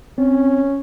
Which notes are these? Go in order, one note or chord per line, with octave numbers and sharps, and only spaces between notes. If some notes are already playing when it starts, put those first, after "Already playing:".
C4 C#4